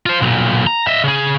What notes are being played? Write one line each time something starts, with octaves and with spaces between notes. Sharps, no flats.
F4 C5
B1 A#2
A#5
D#5 E5
C#3 G#4